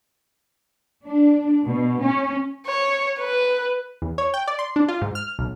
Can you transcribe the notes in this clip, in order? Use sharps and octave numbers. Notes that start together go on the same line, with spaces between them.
D4
B2
C#4
C#5
B4
E2
C#5
G5
D5
C6
D4
F4
G#2
F6
B1